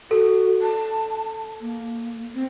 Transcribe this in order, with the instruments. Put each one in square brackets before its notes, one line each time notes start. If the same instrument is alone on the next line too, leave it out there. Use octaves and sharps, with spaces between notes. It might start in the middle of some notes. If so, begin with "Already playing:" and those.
[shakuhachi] F#4 [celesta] A4
[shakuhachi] A5
A#3
C4